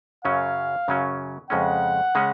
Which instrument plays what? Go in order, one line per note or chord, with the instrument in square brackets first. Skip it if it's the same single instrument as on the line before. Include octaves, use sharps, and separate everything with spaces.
[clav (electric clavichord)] F#2 C#3 F#3 C#4 [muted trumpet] F5
[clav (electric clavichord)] F#2 C#3 F#3 C#4
[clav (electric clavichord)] F2 C#3 G#3 C#4 [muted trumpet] F#5
[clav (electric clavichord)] C#3 G#3 C#4